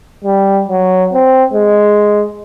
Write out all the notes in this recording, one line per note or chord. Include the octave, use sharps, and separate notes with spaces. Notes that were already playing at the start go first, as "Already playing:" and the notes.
G3
F#3
C4
G#3